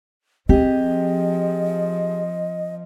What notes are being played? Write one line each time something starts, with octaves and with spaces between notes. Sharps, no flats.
F3 C4 G4 G#4 D#5